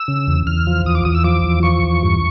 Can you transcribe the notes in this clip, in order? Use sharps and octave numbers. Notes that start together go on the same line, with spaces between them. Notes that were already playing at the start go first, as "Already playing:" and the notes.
Already playing: E6
C#3
E2
E2 F6
F3
E2 D#6
D6
E2 D#6
E6
F3 D6
E2
F3 C#6
E2
G2